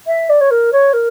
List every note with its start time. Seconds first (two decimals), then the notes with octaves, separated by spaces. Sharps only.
0.06 E5
0.29 D5
0.40 C#5
0.50 A#4
0.72 C#5
0.93 A#4